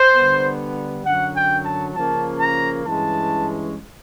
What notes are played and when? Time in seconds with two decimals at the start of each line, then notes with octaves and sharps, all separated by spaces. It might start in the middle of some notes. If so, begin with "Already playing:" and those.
Already playing: C5
0.14 D3 G3 B3
1.04 F#2 D3 F#3 F#5
1.35 G5
1.64 A5
1.94 C#3 F3 A#3 C#4 A5
2.40 A#5
2.85 G2 E3 G#3 C#4 A5